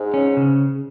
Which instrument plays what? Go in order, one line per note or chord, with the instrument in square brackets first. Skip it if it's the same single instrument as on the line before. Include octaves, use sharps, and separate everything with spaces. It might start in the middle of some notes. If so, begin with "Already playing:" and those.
Already playing: [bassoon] G#2
[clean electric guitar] C#4
C#3